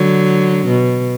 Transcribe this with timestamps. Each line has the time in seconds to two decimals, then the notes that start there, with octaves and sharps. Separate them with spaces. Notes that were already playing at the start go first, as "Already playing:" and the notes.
Already playing: D3 F#3
0.66 B2